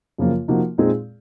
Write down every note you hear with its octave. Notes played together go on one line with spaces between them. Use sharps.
F#2 C#3 F3 A#3 F4
C3 F3 A#3 D#4 F#4
A#2 G#3 C4 D#4 G#4